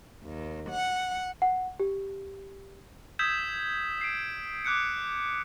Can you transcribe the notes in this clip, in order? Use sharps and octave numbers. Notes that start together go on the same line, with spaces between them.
D#2
F#5
F#5
G4
D#6 E6 G6 G#6 B6 E7
C7 D7
D6 F#6 G6 C#7